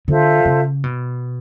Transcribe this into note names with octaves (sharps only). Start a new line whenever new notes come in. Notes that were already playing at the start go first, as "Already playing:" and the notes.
D3 F4 A4 C5 E5
C#3
B2